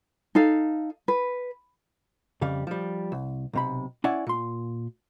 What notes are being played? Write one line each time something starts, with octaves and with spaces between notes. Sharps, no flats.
D#4 A4 F5
B4
F2 C#3 G3 F5
F3 G3
C2
B1 C3 B5
C#4 E4 D5 F#5 G#5
A#2 C6